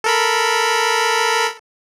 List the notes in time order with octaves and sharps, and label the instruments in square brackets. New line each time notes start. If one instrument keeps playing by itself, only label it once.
[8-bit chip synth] A4 A#4 B5